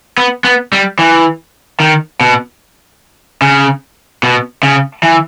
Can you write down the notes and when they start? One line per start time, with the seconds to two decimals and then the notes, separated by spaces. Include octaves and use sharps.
0.18 B3
0.44 B3
0.73 G3
0.99 E3
1.80 D#3
2.21 B2
3.42 C#3
4.23 B2
4.63 C#3
5.03 E3